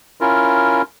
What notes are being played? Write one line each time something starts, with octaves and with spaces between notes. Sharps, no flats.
C#4 E4 F4 A#4